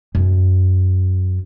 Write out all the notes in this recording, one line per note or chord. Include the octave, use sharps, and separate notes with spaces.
F#2